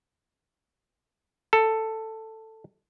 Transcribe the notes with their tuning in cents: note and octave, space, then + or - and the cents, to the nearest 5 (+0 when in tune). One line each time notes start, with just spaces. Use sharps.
A4 +10